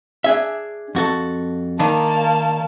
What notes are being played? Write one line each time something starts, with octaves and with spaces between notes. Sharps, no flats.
D4 G#4 E5
F2 F#4 A4
D#3 A#3 D4 D#4 A5